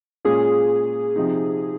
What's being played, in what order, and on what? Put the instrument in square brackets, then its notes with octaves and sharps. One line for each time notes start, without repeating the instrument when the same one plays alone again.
[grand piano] A#2 G#3 C#4 F4 [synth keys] G#4
[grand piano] C3 F3 C4 D#4